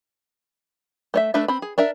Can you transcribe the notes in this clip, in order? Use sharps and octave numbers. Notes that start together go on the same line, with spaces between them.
A3 C#5 E5
A3 D4 A4 B4 E5
C4 B5
G#4
D4 A#4 E5